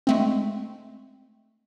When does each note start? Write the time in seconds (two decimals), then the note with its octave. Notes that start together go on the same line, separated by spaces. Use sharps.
0.07 G#3 A3 C4